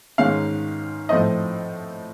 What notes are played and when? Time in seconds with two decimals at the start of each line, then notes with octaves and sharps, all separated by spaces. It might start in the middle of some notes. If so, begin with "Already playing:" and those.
0.18 G#2 D#3 G#3 C#4 F5
1.09 A2 F3 A3 C4 D#5